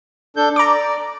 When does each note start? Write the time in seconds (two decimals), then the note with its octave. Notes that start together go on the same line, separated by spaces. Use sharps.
0.37 D4 A4 G6
0.56 D5 A#5 D6